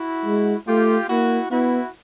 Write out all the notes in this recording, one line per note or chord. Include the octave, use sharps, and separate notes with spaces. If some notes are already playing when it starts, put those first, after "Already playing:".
Already playing: E4 F#4
G#3
A3 F4 G4
A#3 E4 F#4
B3 E4 F#4